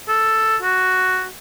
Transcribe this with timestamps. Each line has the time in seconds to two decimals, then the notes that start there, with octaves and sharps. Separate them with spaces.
0.09 A4
0.62 F#4